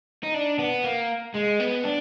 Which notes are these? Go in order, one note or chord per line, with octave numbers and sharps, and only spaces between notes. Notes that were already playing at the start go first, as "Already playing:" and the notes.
D#4
D4
B3
A#3
G#3
B3
D4